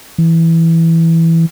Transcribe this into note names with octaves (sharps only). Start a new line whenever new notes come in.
E3